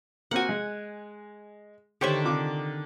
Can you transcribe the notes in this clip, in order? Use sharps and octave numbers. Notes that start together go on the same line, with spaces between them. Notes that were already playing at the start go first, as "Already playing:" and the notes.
A#3 C4 F#4 F#5 G#5
G#3
D3 D#3 G4 C5 C#5 E5
C3 F4 D6